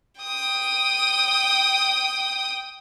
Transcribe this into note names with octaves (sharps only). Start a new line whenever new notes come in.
G5 D#6